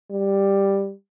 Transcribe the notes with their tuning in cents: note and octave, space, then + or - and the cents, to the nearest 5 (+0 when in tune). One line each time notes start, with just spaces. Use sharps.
G3 +5